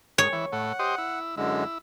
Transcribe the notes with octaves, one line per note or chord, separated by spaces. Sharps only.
G#2 C#5
E3
A2 F#5
G4 C5 D#5
E4
F#2 D3 G#3 E4